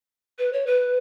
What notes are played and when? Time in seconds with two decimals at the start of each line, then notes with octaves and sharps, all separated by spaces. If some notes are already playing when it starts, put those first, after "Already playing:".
0.38 B4
0.52 C#5
0.66 B4